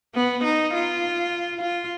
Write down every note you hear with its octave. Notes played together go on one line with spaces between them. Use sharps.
B3
D#4
F4
F4